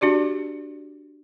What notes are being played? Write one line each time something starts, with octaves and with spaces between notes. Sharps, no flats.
D4 F#4 G4 D5